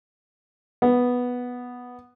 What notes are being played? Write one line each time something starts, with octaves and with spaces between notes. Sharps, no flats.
B3